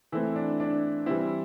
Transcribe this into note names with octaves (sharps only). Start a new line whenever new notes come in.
E3 A3 C4 E4
D4
D4
E3 G3 C4 E4